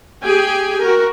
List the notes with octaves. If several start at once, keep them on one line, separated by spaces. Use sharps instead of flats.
G4 G#4 G5 G#5
F#4 A#4